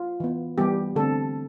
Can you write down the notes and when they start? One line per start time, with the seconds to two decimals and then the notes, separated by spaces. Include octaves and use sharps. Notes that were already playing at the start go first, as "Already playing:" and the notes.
Already playing: F4
0.20 E3 B3
0.58 E3 G3 B3 G4
0.96 D3 A3 C4 A4